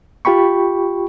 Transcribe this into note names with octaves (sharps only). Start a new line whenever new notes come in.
F4 G4 G5 B5 C#6